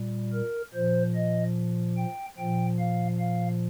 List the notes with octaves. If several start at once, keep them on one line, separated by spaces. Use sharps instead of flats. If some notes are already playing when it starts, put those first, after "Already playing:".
Already playing: A#2 G3
A#4
A#2 F3 C5
D#5
G5
A#2 F3 G5
F5
F5